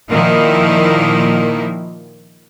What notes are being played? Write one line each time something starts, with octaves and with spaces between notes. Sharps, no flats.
A#2 D#3 F3 A#3 E4